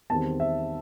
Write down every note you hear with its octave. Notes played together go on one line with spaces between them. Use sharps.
E2 D#3 G3 C4 A5
E5